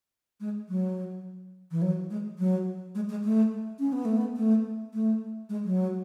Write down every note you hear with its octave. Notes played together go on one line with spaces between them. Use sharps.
G#3
F#3
E3
F#3
G#3
F#3
G#3
G#3
A3
C#4
B3
A3
B3
A3
A3
G#3
F#3